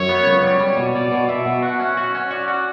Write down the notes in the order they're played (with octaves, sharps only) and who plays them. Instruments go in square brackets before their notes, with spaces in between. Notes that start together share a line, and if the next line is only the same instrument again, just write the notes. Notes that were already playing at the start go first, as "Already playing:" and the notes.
Already playing: [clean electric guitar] F#2 [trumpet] C#5
[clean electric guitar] B3
C#2
G3
G3
B2
[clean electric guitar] B2 [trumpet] D5
[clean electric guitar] B2
[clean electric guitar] B2 [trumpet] E5
[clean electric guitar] B2
[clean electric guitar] F#4 [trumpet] F#5
[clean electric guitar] C#4
F#4
C#4
[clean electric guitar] F#4 [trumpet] D5
[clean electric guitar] F#4